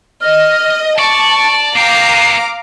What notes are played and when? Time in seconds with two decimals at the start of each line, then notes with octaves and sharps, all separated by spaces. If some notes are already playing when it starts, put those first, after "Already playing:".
0.21 D#5 F6
0.98 D5 A5 C#6
1.75 A#3 F5 G5 A#5 D6 C7